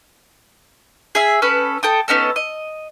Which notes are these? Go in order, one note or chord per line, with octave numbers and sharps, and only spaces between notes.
G#4 E5
C#4 A4 B4
A4 G5 D#6
B3 C#4 D#4 A4
D#5